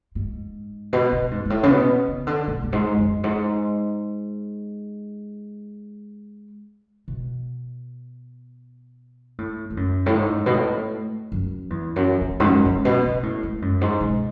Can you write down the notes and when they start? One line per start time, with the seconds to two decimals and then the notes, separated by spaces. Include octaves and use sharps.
0.15 G#2
0.93 B2
1.12 B2
1.31 G#2
1.45 G#2
1.50 A2
1.63 C#3
1.70 B2
2.08 C#3
2.27 D3
2.47 B2
2.63 F#2
2.72 G#2
2.98 F#2
3.24 G#2
7.08 B2
9.38 A2
9.70 G#2
9.77 F#2
10.06 A2
10.15 G#2
10.46 B2
10.54 A2
11.32 F#2
11.70 E2
11.96 F#2
12.21 E2
12.40 G#2
12.46 F#2
12.65 G#2
12.85 B2
13.05 B2
13.23 A2
13.43 G#2
13.62 F#2
13.81 G#2
14.00 B2